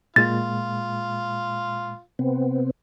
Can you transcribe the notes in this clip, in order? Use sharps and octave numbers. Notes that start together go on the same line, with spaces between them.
A#2 G#3 F4 A6
C3 B3 C4